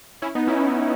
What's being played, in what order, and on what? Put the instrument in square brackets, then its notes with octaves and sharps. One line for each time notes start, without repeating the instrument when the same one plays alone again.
[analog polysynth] C#4 E4
B3 D#4
C#4 E4